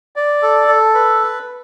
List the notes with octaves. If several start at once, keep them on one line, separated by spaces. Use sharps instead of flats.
D5
A4
A4
B4